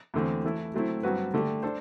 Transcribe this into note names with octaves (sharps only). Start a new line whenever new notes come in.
E2 D3 A3 C4
E3 A3 E4
F#3 A3 C4 E4
G2 F#3 C4 F#4 B4
D3 A3 D4 G4
D4 A4 C5